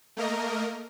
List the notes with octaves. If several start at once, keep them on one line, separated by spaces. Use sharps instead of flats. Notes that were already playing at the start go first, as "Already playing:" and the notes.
A3 A#3 A#4 D#5